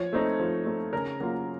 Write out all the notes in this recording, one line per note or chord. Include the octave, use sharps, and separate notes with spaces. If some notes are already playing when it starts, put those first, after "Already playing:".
Already playing: F3 C#5
A3 C4 D#4
F3
A3 C4 D#4
C#3 A#4
F#3 A#3 F4 A#4